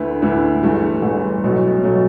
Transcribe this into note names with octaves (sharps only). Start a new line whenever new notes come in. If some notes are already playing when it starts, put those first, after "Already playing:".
Already playing: D2 D3 A3 E4 B4
D2 D3 A3 E4 B4
G1 G2 E3 A3
G1 G2 E3 A3
B1 B2 F#3 A3
B2 F#3 A3